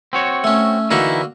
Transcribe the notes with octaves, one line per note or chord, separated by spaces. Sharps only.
C4 F#4 C#5
A3 C#4
D3 E3 A#3 D#4 E4 F#4